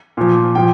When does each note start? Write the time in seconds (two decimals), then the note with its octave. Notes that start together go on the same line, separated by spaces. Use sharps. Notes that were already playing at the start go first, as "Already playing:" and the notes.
0.17 A#2 F3
0.55 A#2 F3 G5